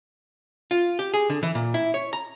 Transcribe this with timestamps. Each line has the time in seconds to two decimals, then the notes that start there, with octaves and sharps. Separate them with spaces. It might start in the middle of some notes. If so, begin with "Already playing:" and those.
0.71 F4
0.99 G4
1.14 G#4
1.30 D3
1.43 E3
1.55 A#2
1.74 E4
1.94 C#5
2.13 A#5